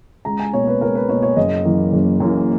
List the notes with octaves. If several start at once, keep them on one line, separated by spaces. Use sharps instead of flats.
C#2 A#5
G#5
B2 A#3 C#5
B4
C#2 A#4
B4
B2 A#3 C#5
C#5
F#1 D#5
F#2 E3 A#3
F#1
F#2 E3 A#3